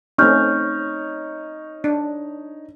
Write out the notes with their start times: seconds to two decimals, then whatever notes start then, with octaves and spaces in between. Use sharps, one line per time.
0.18 A3 C4 C#4 D#4 C#5 C#6 F6 G6
1.84 D4